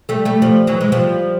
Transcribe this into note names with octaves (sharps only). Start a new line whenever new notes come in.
G3 A3
G3 A3
F3 G3
E3 F#3
G#3
F3 G3